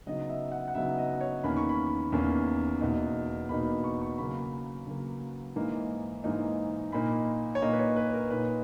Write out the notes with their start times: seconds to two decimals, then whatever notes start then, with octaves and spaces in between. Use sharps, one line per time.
0.07 C#3 F#3 B3 D#4 D#5
0.29 E5
0.52 F#5
0.68 F#5
0.75 C#3 F#3 B3 D#4 E5
0.98 D#5
1.21 C#5
1.44 E2 D#3 A#3 C#4 B5
1.57 C#6
1.69 B5
2.12 E2 D#3 A#3 C#4
2.81 E2 B2 A#3 D#4
3.49 E2 B2 A#3 D#4 B5
3.84 C#6
4.02 C#6
4.18 C#3 F#3 A#3 B5
4.87 C#3 F#3 A#3
5.56 G#2 E3 A#3 D#4
6.24 G#2 E3 A#3 D#4
6.92 A#2 A#3 D#4 B5
7.55 C#5
7.62 A#2 A#3 D#4 D#5
7.73 B4
7.79 C#5
7.96 B4
8.14 A#4
8.30 A#2 A#3 D#4 B4